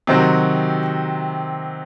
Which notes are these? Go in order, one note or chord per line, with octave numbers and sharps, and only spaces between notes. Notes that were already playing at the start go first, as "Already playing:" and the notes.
C3 D#3 F#3 C4 F#4